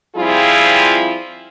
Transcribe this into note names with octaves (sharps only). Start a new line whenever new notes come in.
F3 G3 C4 E4 F4 G#4